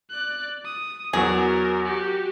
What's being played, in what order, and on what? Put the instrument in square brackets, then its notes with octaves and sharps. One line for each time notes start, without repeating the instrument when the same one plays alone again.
[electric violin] D5 F#6
D#6
[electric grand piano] E2 F#3 F#4 [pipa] G#4 [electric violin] A#4
[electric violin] F#4 G4